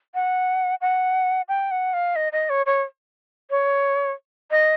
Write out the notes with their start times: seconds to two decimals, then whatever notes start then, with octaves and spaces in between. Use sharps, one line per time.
0.14 F#5
0.81 F#5
1.48 G5
1.71 F#5
1.93 F5
2.16 D#5
2.32 D#5
2.50 C#5
2.66 C#5
3.50 C#5
4.51 D#5